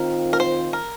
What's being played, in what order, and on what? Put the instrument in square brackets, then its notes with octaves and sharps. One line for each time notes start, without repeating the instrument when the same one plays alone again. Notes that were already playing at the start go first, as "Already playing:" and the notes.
Already playing: [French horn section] D#3 C4 F4 [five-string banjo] A#4
[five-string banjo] A#4
C5
A#4